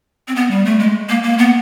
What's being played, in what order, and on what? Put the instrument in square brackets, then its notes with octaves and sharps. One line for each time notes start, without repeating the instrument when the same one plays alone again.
[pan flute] C4
B3
G3
A3
G#3
A#3
A#3
B3